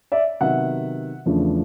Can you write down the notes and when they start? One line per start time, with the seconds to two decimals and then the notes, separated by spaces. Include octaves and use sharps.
0.12 D5 E5
0.40 C3 D#3 F#3 B3 E5 F#5
1.26 E2 C#3 F3 A3 D4